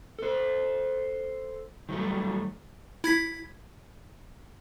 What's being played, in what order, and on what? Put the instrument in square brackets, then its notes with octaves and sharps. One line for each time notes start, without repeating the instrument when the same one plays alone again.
[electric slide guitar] A4 C5
D#3 F#3 G3 A3
[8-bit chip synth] E4 G#6 B6